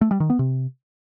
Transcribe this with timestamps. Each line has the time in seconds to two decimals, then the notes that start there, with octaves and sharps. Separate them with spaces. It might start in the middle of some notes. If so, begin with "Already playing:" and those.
0.01 A3
0.11 G3
0.20 D#3
0.30 B3
0.39 C3